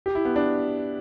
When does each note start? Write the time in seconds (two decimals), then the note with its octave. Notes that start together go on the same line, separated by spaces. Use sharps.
0.06 G4
0.15 E4
0.25 B3
0.36 D4